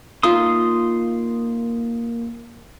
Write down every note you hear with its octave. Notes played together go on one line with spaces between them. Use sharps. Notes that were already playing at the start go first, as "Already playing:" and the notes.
A#3 D#4 F4 E5 C6 D#6